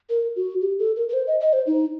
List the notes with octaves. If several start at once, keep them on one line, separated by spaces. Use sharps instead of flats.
A#4
F#4
G4
A4
A#4
A#4
C5
D#5
D#5
C5
D#4